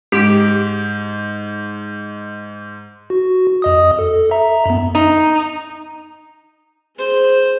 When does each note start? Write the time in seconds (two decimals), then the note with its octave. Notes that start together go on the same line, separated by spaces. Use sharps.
0.12 G#2 G4
3.10 F#4
3.62 F2 D#5 D#6
3.99 A4
4.31 E5 A#5
4.66 F#2 B3
4.95 D#4
6.96 G#4 C5